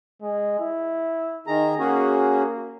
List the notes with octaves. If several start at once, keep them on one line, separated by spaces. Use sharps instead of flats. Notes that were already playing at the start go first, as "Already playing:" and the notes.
G#3
E4
D#3 G#4 A#5
A#3 C#4 F#4 G#4